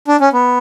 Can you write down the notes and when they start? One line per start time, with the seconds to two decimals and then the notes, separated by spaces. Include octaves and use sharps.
0.08 D4
0.21 C#4
0.33 B3